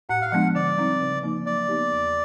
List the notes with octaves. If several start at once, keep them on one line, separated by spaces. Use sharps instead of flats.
A2 F#5
F5
F3 G#3 B3 D4 F#5
D3 D5
G3 C4 D#4
C#3
F3 A#3 D#4
F#3 D5
B3 D#4 G4
E2